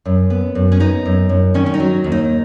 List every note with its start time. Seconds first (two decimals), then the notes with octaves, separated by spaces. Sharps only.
0.05 F#2
0.30 B3
0.55 F#2
0.72 C#4
0.80 B3 D#4
1.05 F#2
1.29 F#2
1.54 D#3 C#4
1.66 C#4
1.74 D#4
1.80 F#3
2.04 D#2
2.12 D#4